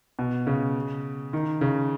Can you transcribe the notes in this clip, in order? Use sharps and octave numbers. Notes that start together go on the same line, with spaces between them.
B2
C#3
D#3
C#3